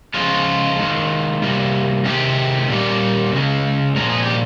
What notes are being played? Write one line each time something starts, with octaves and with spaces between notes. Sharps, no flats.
C#3 F3 G#3 F4
D#3 G#3
C3 G3 A#3
C3 D#3 G#3 G4
A#2 G3 A#3
C#3 G#3
A#2 F3 G#3 A#4
G#4
G4